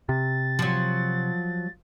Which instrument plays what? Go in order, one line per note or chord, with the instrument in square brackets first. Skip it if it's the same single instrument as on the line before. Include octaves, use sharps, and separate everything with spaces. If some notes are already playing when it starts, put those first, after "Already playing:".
[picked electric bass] C3 [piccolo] A6
[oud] F3 F#3